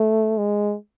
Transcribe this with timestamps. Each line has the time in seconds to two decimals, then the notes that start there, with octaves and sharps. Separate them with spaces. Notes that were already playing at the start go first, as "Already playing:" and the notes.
Already playing: A3
0.38 G#3